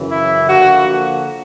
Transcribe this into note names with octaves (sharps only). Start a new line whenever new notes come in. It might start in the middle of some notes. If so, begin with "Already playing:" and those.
Already playing: F#2 C#3 E3
E4
D3 F3 A#3 F#4